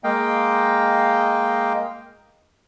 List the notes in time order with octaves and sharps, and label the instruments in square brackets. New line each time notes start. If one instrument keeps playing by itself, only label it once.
[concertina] G#3 A#3 D#5 F5 G5